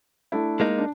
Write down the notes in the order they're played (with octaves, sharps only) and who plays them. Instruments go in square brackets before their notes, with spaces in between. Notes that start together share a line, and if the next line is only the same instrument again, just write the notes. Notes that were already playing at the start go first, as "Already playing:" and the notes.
[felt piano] A3 D4 E4
[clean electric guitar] G#3 A#3 D#4
[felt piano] D4